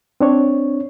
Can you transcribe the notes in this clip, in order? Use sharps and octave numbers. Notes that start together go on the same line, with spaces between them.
C4 D4 C#5